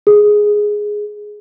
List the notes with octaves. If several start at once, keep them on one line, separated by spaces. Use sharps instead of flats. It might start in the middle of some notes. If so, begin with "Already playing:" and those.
G#4